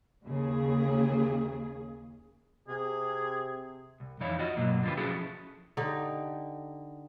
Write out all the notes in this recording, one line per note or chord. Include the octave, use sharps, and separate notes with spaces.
D#2 C#3 G#4
C3 G#4
C2
F2 E3 D#4 E4 C#5 F5
F4 F#4 D#5
G2 B2 F#3 A#3
D3 F3 F4 G4 B4
F3 C#4 E4 F#4 G#4 A4
D3 D#4 G4